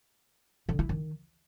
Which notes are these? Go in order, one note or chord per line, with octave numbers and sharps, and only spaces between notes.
D3
E4
D#3